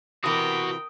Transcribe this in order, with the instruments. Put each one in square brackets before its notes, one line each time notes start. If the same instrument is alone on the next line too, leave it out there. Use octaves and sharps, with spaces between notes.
[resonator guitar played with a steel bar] C3 E3 [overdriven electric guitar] F#4 B4 [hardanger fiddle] A#4 G5 [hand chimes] D#6